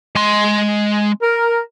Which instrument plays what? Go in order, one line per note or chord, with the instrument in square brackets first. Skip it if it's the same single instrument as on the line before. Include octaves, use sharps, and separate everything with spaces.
[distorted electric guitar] G#3 C6
[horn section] A#4